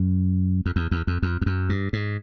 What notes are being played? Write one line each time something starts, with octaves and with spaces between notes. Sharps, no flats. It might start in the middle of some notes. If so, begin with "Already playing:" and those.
Already playing: F#2
F2
E2
E2
F2
F2
F2
F#2
G2
G#2